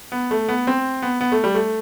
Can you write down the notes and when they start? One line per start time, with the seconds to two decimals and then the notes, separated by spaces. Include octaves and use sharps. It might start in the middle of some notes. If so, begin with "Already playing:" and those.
0.12 B3
0.31 A3
0.49 B3
0.67 C4
1.02 B3
1.21 B3
1.32 A3
1.44 G3
1.55 A3